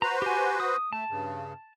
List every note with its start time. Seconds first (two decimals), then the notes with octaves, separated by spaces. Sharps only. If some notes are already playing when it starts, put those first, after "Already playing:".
0.02 F#4 B4 C5 A#5
0.22 G4 G#5
0.60 D#6
0.93 A3 A5
1.10 G2 C#3